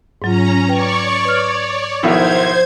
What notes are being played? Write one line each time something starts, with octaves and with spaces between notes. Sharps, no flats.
G#2 F#3 C#4 F4 A#5
B4 C#5 D5 G5 C#6
B4 C#5 D5 F6
B1 D#3 F3 E4 C5 G#6